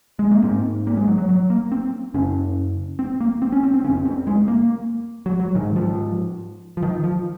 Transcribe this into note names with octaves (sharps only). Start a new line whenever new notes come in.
G#3
A#3
G#2 C4
A#3
G#3
F#3
F#3
F#3
A#3
C4
F#2 C#3 C#4
C4
A#3
C4
C#4
C4
C4
F2 C#3 C#4
C4
G#3
A#3
F#3
F#3
G#2 D#3
F3
F3
D#3
F3